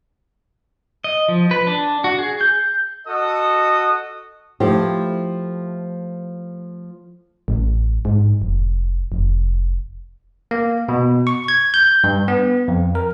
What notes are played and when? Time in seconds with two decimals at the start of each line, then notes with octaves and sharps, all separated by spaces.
1.04 D#5
1.28 F3
1.51 B4
1.67 D4
2.04 F#4
2.19 G#4
2.41 G6
3.07 F#4 A4 D#5 D#6
4.60 F3 A3 E4 G4
7.48 A1
8.05 G#2
8.42 F1
9.12 F1
10.51 A#3
10.89 B2
11.27 C#6
11.48 G#6
11.74 G6
12.04 G2
12.28 B3
12.68 F2
12.95 A#4